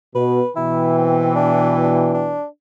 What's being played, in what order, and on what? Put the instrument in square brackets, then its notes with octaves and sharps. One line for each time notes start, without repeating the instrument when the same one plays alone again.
[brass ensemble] B2 [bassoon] B4
[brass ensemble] B2 E3 G5 [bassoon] E4
[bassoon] C4
D4
D4
D4